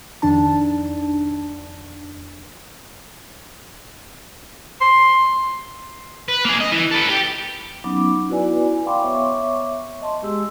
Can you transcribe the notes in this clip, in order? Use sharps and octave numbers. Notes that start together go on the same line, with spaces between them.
F2 D#3 D4 A5
C6
B4
A#3 G#4
D#5
E3
A4 B4
G4
F#3 B3 C#4 D#4 B5 D6
B3 E4 F#4 B4 D5 G#5
D5 F5 G5 B5 C6 D6
B3 C#5 E5 C#6 D6
D#5 A5 C6
G#3 G4 G#4 C6 E6